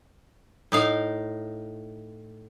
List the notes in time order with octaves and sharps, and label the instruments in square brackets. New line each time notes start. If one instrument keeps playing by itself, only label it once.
[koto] A2 D#4 F5